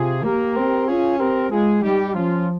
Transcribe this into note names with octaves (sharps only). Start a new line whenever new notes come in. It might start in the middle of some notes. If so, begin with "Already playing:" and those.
Already playing: C3 F4 G#4
A#3 G4 A#4
C4
C#4 F4 G#4
C4 G4 A#4
G#3 F4 G#4
G3 D#4 G4
F3 C#4 F4